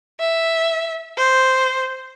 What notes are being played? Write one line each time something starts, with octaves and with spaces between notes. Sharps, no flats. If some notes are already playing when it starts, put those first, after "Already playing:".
E5
C5